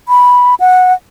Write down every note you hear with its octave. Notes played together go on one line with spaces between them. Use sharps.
B5
F#5